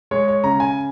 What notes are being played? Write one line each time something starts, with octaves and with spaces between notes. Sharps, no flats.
G#3 C#5
C#5
C#3 A#5
G#5